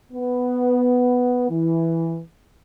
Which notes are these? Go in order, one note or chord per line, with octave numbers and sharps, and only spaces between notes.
B3
E3